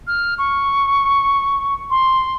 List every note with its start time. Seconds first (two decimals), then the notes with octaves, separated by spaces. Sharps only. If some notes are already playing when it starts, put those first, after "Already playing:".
0.07 F6
0.38 C#6
1.90 C6